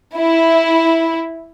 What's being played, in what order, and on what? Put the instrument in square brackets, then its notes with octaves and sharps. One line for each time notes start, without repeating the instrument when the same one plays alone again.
[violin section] E4